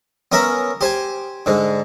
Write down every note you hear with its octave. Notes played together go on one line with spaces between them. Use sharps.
B3 C#4 A#4 E5 B5
G4 C5 G#5
G#2 D3